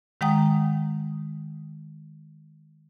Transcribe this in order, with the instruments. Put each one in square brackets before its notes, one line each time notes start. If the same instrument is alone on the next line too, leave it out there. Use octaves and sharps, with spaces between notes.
[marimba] D#3 G#3 F#5 G5 A#5 D#6